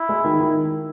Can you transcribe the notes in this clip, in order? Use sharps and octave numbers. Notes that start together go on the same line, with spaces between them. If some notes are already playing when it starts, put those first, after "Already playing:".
Already playing: E4
G#3
D#3
D#3